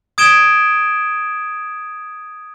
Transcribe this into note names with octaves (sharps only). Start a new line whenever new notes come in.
D#6 G#6 D7 E7 G7